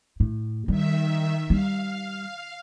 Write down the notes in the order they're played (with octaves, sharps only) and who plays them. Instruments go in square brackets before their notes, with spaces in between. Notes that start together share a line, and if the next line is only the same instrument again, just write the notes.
[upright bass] A2
[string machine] D#3 E5 [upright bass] G3
[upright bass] G3 [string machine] F5